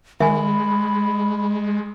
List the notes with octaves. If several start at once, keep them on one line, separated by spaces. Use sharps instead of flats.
D#3 G#3 E5 G#5 B5